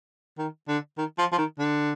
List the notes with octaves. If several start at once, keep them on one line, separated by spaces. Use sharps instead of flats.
D#3
D3
D#3
F3
F3
D#3
D3